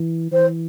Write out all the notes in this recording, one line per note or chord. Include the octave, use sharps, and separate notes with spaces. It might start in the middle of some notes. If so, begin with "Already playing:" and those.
Already playing: E3
E3 C5